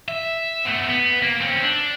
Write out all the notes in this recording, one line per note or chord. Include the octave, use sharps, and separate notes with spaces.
E5
B2 A3
B3
A#3
C4 C#4
D4